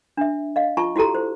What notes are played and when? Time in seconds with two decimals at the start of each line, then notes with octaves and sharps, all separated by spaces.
0.17 D4 E5
0.56 D#5 F5
0.77 F4 A5 C#6
0.96 E4 F#4 G4 A4 A#5
1.15 C5